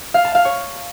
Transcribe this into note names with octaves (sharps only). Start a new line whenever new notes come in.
F5
A5
F5
C#5